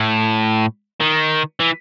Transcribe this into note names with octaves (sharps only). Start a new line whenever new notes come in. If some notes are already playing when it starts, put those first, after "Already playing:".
Already playing: A2
D#3
E3